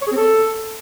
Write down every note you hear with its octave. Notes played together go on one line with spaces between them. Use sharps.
C#5
G#4
C4
A4